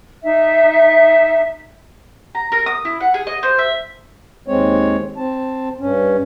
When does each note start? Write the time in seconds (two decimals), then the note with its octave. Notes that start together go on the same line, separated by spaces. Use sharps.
0.24 D#4 E5
2.35 A#5
2.52 A#4
2.66 D#6
2.85 E4
3.00 F#5
3.14 G#4
3.27 D#5
3.43 C5
3.59 E5
4.48 D#2 G#3 C4 C#5
5.17 C4 A5
5.80 G2 C#4